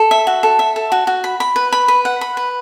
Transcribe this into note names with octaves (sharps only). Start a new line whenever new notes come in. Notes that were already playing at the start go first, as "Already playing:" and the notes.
Already playing: A4
E5
F#4
A4
E5
A4
F#4
F#4
B5
B5
B4
B5
B4
F#5
B5
B4